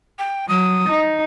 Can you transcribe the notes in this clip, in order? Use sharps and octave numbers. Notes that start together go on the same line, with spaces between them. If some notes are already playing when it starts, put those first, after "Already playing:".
G5
F#3 D#6
D#4